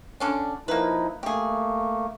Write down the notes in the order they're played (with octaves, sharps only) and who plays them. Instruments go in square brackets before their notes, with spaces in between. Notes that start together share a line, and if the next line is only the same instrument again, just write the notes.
[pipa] D3 C#4 D4
[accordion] F3 D#4 E4 [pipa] A#3 B4
[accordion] A3 A#3 [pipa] G4 G#4